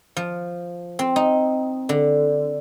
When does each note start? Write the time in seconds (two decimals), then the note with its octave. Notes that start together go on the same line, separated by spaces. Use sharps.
0.16 F3
0.99 C4
1.16 D#4
1.89 D3